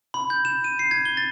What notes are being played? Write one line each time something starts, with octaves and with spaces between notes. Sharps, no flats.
B5
G6
E7
D#7
C7
G#6
G7
A6